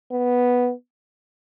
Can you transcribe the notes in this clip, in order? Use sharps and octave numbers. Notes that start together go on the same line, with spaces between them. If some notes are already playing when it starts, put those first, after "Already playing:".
B3